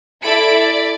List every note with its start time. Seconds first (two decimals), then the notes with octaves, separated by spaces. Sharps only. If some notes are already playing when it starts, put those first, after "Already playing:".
0.23 E4 A4 D5 E5 B5 D7
0.57 D5